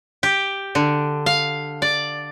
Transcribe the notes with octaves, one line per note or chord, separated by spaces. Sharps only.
G4
D3
F5
D5